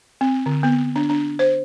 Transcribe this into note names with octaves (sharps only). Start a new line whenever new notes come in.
C4
D3
B3
D4
D4
C5